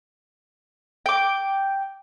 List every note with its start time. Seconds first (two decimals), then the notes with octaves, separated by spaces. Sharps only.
1.06 G5 D6